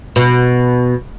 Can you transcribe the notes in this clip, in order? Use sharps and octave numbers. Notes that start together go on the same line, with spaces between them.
B2